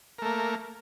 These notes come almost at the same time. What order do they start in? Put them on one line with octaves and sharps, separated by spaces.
A#4 A3 A#3